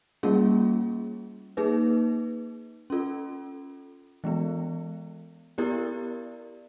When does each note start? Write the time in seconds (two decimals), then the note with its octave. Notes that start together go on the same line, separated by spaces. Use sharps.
0.23 G3 A#3 C#4 F4 G#4
1.57 A#3 D#4 G#4 B4
2.90 C#4 F4 A4
4.24 E3 G#3 B3
5.58 B3 E4 G4 A#4 D5